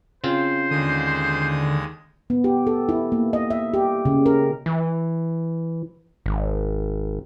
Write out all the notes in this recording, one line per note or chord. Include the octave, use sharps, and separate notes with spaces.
C#3 C4 F4 C5
D#2 D3 G#3 D#6
B3
G4
A4
E4
A#3
D#5
E5
G4
C#3
A#4
E3
G#1